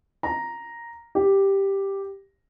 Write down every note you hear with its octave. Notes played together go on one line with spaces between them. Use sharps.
A#5
G4